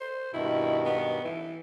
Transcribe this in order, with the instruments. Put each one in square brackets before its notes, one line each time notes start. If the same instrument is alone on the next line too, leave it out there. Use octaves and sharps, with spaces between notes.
[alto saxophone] C5
[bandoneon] G2 B2 D#3 [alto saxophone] E4
[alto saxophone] B3
E3